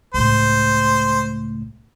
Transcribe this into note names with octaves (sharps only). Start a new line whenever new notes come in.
C#2 A2 C5